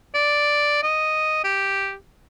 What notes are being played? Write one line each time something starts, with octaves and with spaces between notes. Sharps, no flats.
D5
D#5
G4